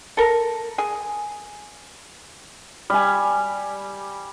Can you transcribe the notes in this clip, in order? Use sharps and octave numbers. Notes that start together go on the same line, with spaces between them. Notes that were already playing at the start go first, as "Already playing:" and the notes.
A4 A#4
G#4
G3 G#5